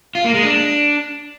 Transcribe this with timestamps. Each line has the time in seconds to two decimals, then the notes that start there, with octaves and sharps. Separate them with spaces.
0.15 F4
0.25 A#3
0.34 G#3
0.44 D4